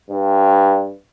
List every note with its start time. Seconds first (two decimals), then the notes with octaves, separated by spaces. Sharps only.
0.10 G2